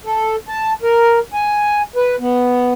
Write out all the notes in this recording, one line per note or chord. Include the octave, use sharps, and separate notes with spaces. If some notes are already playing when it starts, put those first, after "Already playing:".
A4
A5
A#4
G#5
B4
B3